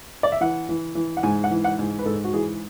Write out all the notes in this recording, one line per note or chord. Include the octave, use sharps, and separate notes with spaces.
D5
E5
E3 F#5
E3
E3
F#5
G#2 G#5
F#5
E3
F#5
G#2
B4
G#2 A4
F#4
E3 G#4